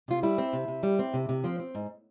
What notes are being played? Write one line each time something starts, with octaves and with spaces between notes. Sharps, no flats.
C3 F4
G3 E4
C4
C3
C3
G3
C4
C3
C3
F3 C4
C4
G#2